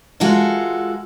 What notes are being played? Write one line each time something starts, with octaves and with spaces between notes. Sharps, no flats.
G#3 F4 F#4 A4 A#4 E5